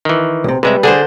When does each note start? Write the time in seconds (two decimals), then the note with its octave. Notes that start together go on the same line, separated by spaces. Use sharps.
0.05 D#3 E3
0.44 B1 C3
0.63 C3 G3 G#3 B4 E5
0.83 D3 D4 G#4 C5